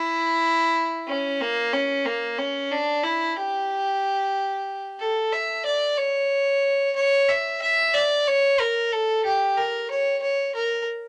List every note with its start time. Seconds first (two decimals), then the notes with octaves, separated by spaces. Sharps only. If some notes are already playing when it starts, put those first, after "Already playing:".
Already playing: E4
1.08 C#4
1.41 A#3
1.73 C#4
2.05 A#3
2.38 C#4
2.71 D4
3.03 E4
3.37 G4
5.00 A4
5.32 E5
5.65 D5
5.97 C#5
6.96 C#5
7.28 E5
7.62 E5
7.94 D5
8.27 C#5
8.60 A#4
8.92 A4
9.25 G4
9.57 A#4
9.90 C#5
10.22 C#5
10.55 A#4